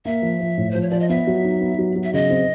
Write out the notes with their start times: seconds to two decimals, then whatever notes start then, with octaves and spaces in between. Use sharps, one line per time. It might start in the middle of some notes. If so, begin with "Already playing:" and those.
0.05 A#3 E5
0.22 F3
0.40 F3
0.57 A2
0.71 F3 C5
0.82 C#5
0.90 F3 D5
1.00 D#5
1.09 B3 E5
1.27 F#3
1.44 D#4
1.61 B3
1.79 F#3
1.96 F#3
2.04 E5
2.13 C#3 D#5
2.30 C4